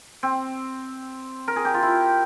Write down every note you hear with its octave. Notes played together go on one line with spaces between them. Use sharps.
C4
A#4
G#4
G4
F4
E4